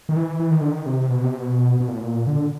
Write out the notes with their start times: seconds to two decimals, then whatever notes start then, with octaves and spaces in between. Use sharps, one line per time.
0.09 D#3
0.16 E3
0.40 E3
0.51 D#3
0.61 D3
0.72 D#3
0.86 C3
1.10 B2
1.24 C3
1.38 B2
1.80 B2
1.88 A#2
1.95 A2
2.02 A#2
2.27 D3